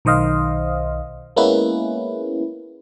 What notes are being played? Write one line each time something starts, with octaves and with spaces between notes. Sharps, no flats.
B1 D#3 C5 D#5 F5
G#3 A#3 B3 C#4 E4 B4